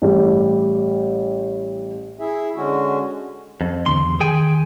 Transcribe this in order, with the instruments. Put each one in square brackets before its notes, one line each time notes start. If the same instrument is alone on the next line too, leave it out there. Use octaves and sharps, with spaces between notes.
[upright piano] A1 G3
[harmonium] E4 G#4 E5
D3 G#3 C#4 F#4
[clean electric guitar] F2
[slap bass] E2 D3 C4 [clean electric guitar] C6
[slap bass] E2 D3
[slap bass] D#3 [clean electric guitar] G#4 G5 G#5